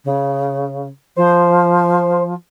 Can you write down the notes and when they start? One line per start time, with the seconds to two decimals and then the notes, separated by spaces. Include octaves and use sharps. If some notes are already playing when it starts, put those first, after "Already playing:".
0.05 C#3
1.17 F3 C5